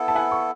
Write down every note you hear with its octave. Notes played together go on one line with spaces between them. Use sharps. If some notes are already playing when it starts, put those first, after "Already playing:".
Already playing: B3 E4 A4
A5
F#5 G#5
C#6